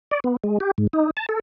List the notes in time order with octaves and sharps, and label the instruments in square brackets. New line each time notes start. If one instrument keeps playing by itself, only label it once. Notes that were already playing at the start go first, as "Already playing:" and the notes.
[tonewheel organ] D5
B3
G#3
G4
G#2
D#4
A5
A4